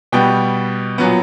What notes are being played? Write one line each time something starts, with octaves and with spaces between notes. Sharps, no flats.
B2 G3 B3 G5
A#2 F#3 B3